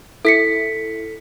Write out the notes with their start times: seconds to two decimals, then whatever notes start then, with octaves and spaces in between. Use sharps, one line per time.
0.25 E4 A4 B6 C#7